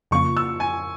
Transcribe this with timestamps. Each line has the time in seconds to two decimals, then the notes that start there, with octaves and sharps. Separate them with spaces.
0.11 F2 C#3 F3 A#3 F4 C#6
0.37 E6
0.60 G#5